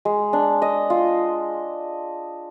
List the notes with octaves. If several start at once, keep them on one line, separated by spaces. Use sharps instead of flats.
G#3
D4
D#5
F4